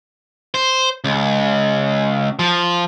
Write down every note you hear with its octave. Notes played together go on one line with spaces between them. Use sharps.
C5
C#2
F3